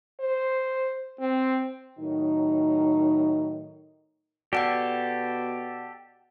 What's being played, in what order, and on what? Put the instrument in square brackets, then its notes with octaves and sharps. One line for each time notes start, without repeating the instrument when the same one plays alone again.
[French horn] C5
C4
[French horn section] A2 D#3 F#3 D#4
[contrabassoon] B2 [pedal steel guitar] G4 A4 [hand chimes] D5 F#5 G5